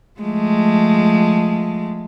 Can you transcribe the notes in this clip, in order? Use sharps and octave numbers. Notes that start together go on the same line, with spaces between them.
F3 G#3 A3